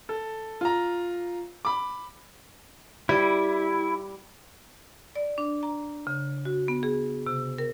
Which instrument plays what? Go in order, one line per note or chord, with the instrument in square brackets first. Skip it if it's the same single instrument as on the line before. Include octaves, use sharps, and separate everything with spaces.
[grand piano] A4
F4 A#5
B5 D6
[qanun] G3 [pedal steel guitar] E4
[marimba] D5
D4
A#5
C#3
F#4
B3
G#4
C3
A#4